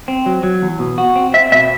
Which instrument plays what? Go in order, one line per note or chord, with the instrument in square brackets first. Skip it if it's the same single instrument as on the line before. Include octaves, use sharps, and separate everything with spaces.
[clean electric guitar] C4
F#3
F#3
E2
B2
F#4
C4
[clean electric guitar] C4 [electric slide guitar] E5
[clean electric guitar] B2 [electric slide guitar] E5